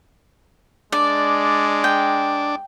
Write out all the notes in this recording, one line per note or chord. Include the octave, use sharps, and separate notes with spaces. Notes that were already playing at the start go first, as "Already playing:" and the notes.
G#3 D4 D5
G5